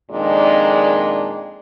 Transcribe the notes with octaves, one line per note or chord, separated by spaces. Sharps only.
F2 A#2 D#3 G#3 D4